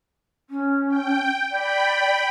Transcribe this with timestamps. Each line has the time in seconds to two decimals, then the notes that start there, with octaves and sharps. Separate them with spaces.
0.50 C#4
0.89 G5
1.51 D5 G5 B5